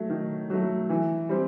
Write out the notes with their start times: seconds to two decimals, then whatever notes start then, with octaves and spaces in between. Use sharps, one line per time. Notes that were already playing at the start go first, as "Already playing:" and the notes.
Already playing: F#3 A3
0.10 D#3
0.50 F#3 A3
0.90 E3
1.29 G3 C4